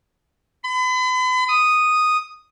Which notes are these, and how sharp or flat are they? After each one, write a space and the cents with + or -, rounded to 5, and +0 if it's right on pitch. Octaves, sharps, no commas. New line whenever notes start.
B5 +40
D#6 -5